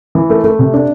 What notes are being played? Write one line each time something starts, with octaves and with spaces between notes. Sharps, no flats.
E3
A3
A3
C3
D4